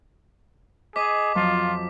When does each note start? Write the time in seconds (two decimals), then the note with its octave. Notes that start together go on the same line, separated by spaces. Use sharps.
0.96 G#4 D#5 D6 D#6 B6
1.35 F2 F3 F#3 F4